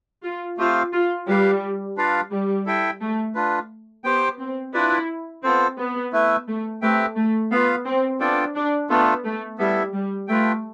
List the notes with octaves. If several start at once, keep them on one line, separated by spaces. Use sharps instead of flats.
F4
A3 C4 F4 G4 C5 F5
F4
G3 G4 B4 F5
D4 F4 B4 D5 F5
G3
E4 A4 E5 G5
A3
D4 F4 B4
B3 G4 C5 G5
C4
D4 E4 F4 B4 D5
B3 C4 F4 A4 C5
B3
A3 E4 B4 E5
A3
A3 C4 G4 B4 E5 G5
A3
B3 F4 B4 F5
C4
B3 D4 F4 A4 D5 G5
D4
A3 B3 D4 F4 A4
A3
G3 B3 E4 A4 E5
G3
A3 F4 B4 E5 G5